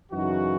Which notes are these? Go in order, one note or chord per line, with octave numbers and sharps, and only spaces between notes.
F#2 C#3 E3 D#4 F#4